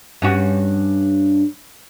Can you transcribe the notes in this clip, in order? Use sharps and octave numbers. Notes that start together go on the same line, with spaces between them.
G2 C#4 F#4